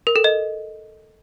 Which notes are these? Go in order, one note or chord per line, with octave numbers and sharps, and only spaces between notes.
A#4
A4
D#5